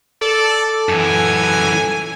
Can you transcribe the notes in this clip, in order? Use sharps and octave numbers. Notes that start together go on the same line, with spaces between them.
A4 D5
F#2 E3 G#5